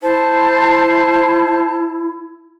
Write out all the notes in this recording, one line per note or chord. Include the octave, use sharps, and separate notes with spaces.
E4 C5 A5